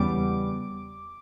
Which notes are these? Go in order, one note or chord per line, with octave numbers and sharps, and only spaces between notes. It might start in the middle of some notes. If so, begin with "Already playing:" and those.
Already playing: E2 C#3 G3 B3 D6